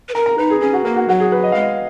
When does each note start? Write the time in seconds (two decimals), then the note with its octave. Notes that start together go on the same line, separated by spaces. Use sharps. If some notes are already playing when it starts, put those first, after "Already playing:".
0.09 B4
0.15 A#4 A#5
0.26 A#5
0.38 D#4 B4
0.50 G#4
0.61 C#4 G#4
0.73 F#4
0.85 A#3 A#4
0.96 F#4
1.09 F#3 F#4
1.20 G#4
1.32 B4
1.44 D#5
1.52 G#3 F5
1.62 D#5